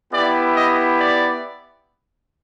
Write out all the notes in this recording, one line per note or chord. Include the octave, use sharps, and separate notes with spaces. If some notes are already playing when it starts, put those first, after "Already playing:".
B3 E4 G4 D5
D#5
D5